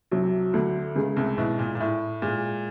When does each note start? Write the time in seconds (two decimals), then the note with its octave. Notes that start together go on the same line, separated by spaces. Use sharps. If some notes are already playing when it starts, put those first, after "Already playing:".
0.11 C2 C3 F#3
0.53 D2 D3 A3
0.95 C#2 C#3 G#3
1.17 C2 C3
1.38 B1 B2 E4
1.59 A#2
1.75 A#2
1.80 A2 E4
2.22 A#2 G#3